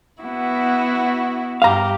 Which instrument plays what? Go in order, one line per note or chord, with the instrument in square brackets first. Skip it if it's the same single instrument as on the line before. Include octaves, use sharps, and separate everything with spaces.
[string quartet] B3 E4 F#4
[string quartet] G2 G4 [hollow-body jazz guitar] F5 A#5